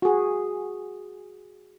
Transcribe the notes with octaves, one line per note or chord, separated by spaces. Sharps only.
F#4 G#4